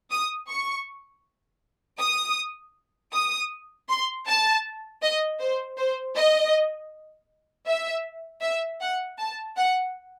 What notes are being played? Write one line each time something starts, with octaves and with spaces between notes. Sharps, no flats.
D#6
C#6
D#6
D#6
C6
A5
D#5
C5
C5
D#5
E5
E5
F#5
A5
F#5